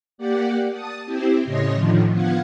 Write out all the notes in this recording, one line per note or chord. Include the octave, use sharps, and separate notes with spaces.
A#3 G4 D5 F#5
A5 D#6
C4 E4 G4 C5
A2 C#3 C#5 D#5 C6 A#6
A2 D3 D#3 F3
F3 B3 F5 F#5 G#6